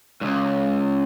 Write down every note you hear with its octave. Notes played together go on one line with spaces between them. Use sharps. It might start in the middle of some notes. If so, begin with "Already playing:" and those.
C#2 G2